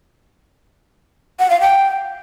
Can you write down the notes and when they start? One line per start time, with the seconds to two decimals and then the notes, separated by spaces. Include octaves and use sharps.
1.40 F#5
1.50 F5
1.61 G5